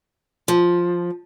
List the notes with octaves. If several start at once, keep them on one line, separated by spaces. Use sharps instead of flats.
F3